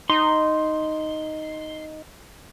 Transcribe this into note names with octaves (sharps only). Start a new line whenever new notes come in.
D#4 C6